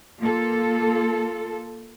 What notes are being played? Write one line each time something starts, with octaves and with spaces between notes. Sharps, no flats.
A#3 F4 A4